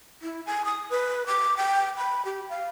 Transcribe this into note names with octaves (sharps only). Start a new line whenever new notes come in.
E4
G#5
D#6
B4
D6
G5
B5
G4
F5